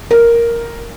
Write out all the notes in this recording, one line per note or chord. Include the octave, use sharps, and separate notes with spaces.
A#4